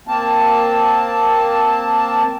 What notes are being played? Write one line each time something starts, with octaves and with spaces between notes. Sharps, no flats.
A#3 C4 A5